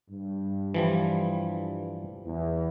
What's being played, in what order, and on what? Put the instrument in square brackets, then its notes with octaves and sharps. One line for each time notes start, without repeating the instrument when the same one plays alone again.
[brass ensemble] G2
[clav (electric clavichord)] E3 F3 G3
[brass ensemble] E2